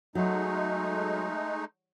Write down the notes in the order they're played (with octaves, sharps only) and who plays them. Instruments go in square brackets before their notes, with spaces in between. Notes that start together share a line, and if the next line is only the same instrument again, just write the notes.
[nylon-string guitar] F#3 [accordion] G#3 A3 D#4